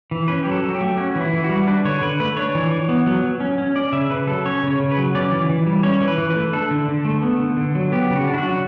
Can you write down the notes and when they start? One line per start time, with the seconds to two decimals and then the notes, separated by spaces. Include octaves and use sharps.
0.11 E3
0.28 C#4 B4
0.43 G4
0.46 F#3
0.52 A4
0.63 F#3
0.70 F#4
0.75 G4
0.81 A3
0.97 C#4 F#4
1.15 E3 E4
1.33 E3
1.44 F#4
1.49 G3
1.67 D4 B4
1.85 D3 C#5
2.01 D3 B4
2.20 A3 B4
2.37 D4 C#5
2.55 E3
2.71 E3
2.89 B3
3.06 F#3
3.23 F#3
3.40 C#4
3.58 C#4
3.76 C#4 D5
3.92 C#3 E5
4.10 C#3 B4
4.27 F#3 A4
4.45 C#4 C#5
4.63 C#3 C#5
4.79 C#3
4.91 B4
4.98 F#3
5.15 C#4 D5
5.32 E3
5.49 E3
5.66 G3
5.83 C#4 C#5
6.01 E3
6.08 B4
6.18 E3
6.30 B4
6.36 A3
6.53 D4 A4
6.70 D3
6.88 D3
7.05 A3
7.22 B3
7.39 D3
7.57 D3
7.75 F#3
7.92 B3 G4
8.10 C#3
8.16 F#4
8.27 D4
8.34 E4
8.38 F#4
8.44 F#3